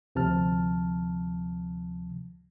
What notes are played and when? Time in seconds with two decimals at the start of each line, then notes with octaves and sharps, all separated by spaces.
0.15 D2 C3 F3 A5 F6